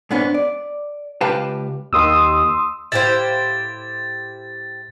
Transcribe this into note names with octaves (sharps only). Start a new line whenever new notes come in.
G#2 B3 C#4 D4
D5
C#2 G4 B4 F5 G5 A5
D#2 C6 D#6 E6
A2 E4 G4 C5 F5 A6